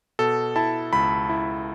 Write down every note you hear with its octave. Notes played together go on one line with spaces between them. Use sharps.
B2 A4
E4 A5
C#2 B5
E4